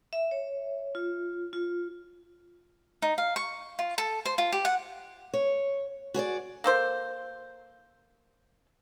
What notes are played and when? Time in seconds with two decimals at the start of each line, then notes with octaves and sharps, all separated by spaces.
0.13 E5
0.31 C#5
0.95 F4
1.53 F4
3.02 D#4
3.18 F5
3.36 C#6
3.79 F4
3.98 A4
4.25 C5
4.38 F4
4.52 G4
4.65 F#5
5.33 C#5
6.14 F#4 G#4 C#5 D5
6.64 A#3 A4 C5